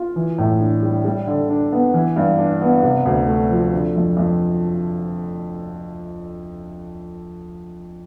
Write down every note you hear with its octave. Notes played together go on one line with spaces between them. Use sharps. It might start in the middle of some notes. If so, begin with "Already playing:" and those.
Already playing: F4
E3
A2
D4
G3
G3
D3
D4
B3
E3
G2
D4
B3
C3
D2
A3
F3
D3
F2
F2